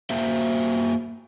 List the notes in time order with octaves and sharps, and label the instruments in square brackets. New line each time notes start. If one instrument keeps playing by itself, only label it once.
[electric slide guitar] A#3 F#4 C5 E5